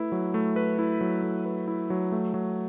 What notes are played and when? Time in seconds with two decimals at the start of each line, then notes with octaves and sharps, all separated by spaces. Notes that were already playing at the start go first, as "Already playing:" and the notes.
Already playing: A3 E4 B4
0.12 F#3
0.34 A3
0.56 B4
0.79 E4
1.01 F#3
1.23 A3
1.45 B4
1.68 E4
1.90 F#3
2.12 A3
2.34 F#3